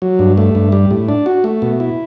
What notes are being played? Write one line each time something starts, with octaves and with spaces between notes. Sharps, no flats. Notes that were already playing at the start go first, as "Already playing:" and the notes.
F#3
G2
A3
G2
G3
A2
D4
F#4
A3
B2
E4